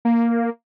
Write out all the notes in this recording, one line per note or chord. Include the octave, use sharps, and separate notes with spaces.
A#3